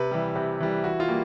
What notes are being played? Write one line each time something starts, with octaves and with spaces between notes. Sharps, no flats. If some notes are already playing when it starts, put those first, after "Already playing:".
Already playing: C3 B4
E3 G3
C3
E3 G3
E3 F#4
F4
G3 A#3